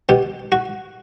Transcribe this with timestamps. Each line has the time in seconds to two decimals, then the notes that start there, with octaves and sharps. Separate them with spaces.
0.09 B2 G4
0.52 F#4